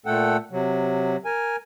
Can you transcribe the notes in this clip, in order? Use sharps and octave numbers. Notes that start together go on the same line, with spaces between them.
A#2 A3 A4 F#5 G5
C3 F#3
A#4 G#5